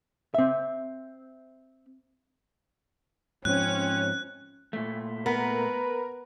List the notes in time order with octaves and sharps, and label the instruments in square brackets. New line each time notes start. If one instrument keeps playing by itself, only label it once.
[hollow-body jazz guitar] C4 E5
[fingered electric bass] G#2 F3 [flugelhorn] C4 [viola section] C#4 [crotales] F#6
[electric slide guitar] A#2 A3
[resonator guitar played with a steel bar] B3 [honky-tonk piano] A#4 [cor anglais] B4